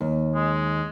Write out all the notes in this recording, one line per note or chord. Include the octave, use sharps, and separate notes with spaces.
D#2
G#3